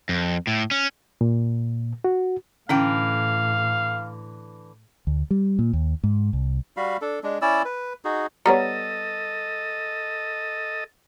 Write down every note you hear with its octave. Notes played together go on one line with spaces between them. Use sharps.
F2
A2
C#4
A#2
F#4
A2 D3 E3 C#4 F5 G5
D2
G3
A#2
D#2
G#2
C2
G3 F#4 F5 B5
D4 A4
G#3 D4
C#4 E4 D5 E6
B4
D#4 F#4 G#4
G3 B3 A4 A#4 C#5 D#5 A#5